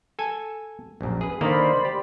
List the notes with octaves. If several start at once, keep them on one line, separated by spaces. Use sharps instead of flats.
A4 G#5
A#1 F#2
G#4 B4
D3 D#3 A#3 C5 D5 B5
G4